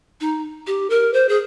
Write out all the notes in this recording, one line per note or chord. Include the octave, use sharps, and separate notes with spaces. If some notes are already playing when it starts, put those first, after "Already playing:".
D#4
G4
A#4
C5
G#4